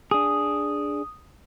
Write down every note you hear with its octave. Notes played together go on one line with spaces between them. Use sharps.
D4 G#4 D#6